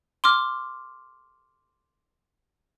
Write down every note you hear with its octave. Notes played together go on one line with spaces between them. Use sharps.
C6 D6 F6